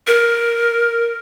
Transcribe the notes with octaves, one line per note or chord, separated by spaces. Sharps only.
A#4